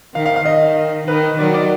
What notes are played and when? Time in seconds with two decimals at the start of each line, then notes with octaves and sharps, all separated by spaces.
0.14 D#3 F5
0.26 F5
0.36 F5
0.45 D#3 D#5
1.07 D#3 B4
1.38 D#3 F#3 D5
1.54 D5